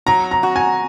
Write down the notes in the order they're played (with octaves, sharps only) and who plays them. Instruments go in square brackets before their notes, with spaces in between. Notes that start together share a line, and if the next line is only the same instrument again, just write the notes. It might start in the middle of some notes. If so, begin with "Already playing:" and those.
[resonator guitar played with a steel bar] F#3 [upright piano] A#5
[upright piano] A#5
[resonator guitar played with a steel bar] F#4
[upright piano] G#5